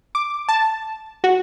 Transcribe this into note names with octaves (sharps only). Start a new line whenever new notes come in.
D6
A5
F#4